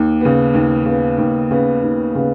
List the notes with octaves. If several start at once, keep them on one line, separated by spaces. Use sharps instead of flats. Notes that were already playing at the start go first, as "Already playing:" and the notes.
Already playing: D#2
C#3 B3
D#2
C#3 B3
D#2
C#3 B3
D#2
C#3 B3